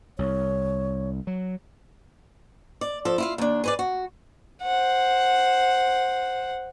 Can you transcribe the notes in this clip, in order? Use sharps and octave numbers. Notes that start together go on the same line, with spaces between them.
C2 C#5
F#3
D5
F3 A4
E4 F4 F5
D#2 D4
G#4 B4 D5
F#4
C5 F#5